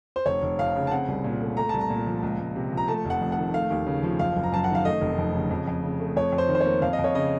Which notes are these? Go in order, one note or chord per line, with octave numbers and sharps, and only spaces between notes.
C5
F1 C#5
F1
F2 F5
C#3
A5
C4 F#5
C2
A#2
A3
A3 A#5
C2 A5
A#5
A#2
F3
C#2
C#2
C3
F3
A#5
A3 A5
F1
F#5
F2
F#5
D#3
A3 F5
D#2
C#3
F3
F#1 F5
F#1
A#5
F#2 A5
F#5
D#3
F5
A3 D#5
F1
F2
C#3
F2
F2
C#3
A3
F2 C#5
F2
C5
D#3
C5
C#5
A#3
F2 F5
D#5
F2
C#5
C#3 D#5